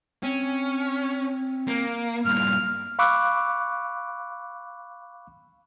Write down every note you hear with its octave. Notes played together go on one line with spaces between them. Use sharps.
C4 C#4
A#3
G2 A#2 F6
F5 B5 C#6 D6 E6 F#6